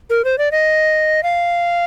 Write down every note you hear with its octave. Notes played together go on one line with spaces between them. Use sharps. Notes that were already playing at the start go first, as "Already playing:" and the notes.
A#4
C5
D5
D#5
F5